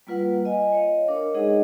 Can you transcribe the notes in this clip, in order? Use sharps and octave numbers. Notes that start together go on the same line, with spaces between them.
G3 A#3 F4 B4 F#5
D#5 G#5
C#5 D#5 F5
D4 A#4 C#5 D6
G#3 D#4 G#4 D#5 F#5